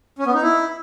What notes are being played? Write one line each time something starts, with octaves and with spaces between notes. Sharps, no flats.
C#4
B3
D#4
E4